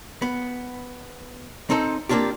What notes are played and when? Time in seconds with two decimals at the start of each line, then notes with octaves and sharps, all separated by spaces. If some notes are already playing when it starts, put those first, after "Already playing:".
0.22 B3
1.70 C4 D#4 A4 C5
2.09 A#3 C4 D4 F4 G4